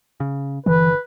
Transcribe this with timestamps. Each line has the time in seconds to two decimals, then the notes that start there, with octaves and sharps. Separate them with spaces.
0.20 C#3
0.66 G1 D3 E3 B4